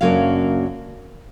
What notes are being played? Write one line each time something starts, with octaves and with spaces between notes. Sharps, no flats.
F#2 C#3 F#3 A#3 D4 F5